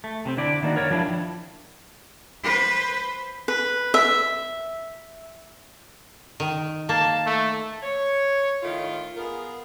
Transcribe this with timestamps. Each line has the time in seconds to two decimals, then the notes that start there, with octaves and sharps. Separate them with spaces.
0.04 A3
0.25 C3 E3 C4
0.37 D3 D4 E4 D5
0.63 D#3 A#3 B3 D4 F#4
0.76 A#4 C#5 D5
0.91 F3 G3 D4 E4
2.43 B4 C5
3.48 B4
3.94 E5
6.40 D#3
6.89 A#3 A5
7.26 A3
7.83 C#5
8.63 A2 D#3 F4
9.17 B3 F4 G#4 A#4